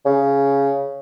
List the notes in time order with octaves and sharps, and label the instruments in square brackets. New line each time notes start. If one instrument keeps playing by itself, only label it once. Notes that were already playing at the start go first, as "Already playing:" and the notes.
[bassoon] C#3